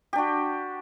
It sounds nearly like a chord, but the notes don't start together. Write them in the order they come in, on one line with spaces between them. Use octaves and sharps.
G4 D4 F#4